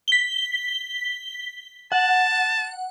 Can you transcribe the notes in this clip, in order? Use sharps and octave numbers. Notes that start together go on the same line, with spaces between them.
B6 G7
F#5 A5